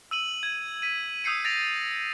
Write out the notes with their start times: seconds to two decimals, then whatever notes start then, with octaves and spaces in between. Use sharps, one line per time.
0.11 E6 D#7 F#7
0.43 G#6
0.82 B6 D#7
1.24 D#6 E6 G6 C7 C#7 D#7
1.45 A6 A#6 D7 F7